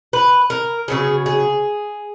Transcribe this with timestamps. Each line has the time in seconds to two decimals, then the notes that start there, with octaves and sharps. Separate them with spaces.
0.13 B4
0.50 A#4
0.88 C#3 F#3 B3 G#4
1.26 G#4